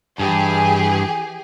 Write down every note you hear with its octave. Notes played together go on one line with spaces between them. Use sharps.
G2 E3 G4 G#4